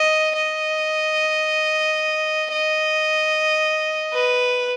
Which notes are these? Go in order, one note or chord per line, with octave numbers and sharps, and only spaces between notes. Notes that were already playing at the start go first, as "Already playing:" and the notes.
Already playing: D#5
D#5
D#5
B4